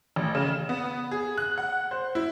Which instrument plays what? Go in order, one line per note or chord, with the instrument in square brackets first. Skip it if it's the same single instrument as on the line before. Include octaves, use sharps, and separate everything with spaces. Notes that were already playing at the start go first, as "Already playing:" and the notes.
[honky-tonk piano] A1
C#3
E7
B3
G#4
F#6
F#5
C5
E4